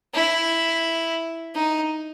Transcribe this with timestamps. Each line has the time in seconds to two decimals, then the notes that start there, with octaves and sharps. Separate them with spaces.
0.14 E4
1.54 D#4